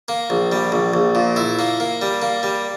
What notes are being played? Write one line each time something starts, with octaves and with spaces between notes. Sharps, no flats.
A#3
A#1
G3
A#1
A#1
A#2
E4
A#3
A#3
G3
A#3
G3